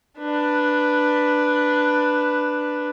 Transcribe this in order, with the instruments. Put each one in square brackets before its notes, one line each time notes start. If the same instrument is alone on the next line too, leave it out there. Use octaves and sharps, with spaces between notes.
[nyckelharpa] D4 B4